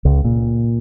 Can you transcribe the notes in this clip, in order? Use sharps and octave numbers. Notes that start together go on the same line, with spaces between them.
C#2
A#2